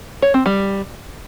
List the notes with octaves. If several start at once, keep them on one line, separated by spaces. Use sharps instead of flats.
C#5
C4
G3